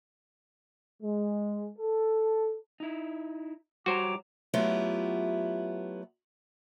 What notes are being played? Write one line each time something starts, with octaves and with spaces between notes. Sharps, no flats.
G#3
A4
D#4 E4
G3 F#4 C5 C#5 A#5 D6
F#3 A3 B3 E4 F4 G4